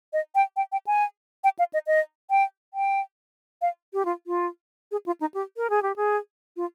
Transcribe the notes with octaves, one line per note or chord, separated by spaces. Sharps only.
D#5
G5
G5
G5
G#5
G5
F5
D#5
D#5
G5
G5
F5
G4
F4
F4
G#4
F4
D#4
G4
A#4
G#4
G4
G#4
F4